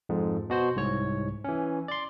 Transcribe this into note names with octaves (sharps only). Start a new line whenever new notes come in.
F2 G#2
B2 F#4 C5
C2 G#2 C#5
E3 C#4
D5 C6